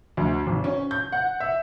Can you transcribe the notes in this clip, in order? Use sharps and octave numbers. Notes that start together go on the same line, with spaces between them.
D2
G#1
C#4
G6
F#5
E5